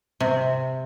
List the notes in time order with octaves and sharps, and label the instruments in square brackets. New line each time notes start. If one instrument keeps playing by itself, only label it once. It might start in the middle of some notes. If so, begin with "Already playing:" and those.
[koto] C3